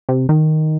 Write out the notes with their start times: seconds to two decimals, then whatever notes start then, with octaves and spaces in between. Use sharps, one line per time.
0.09 C3
0.29 D#3